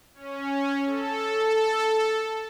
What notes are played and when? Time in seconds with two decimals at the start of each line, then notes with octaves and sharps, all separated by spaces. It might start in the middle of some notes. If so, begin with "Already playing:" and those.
0.14 C#4
0.85 A4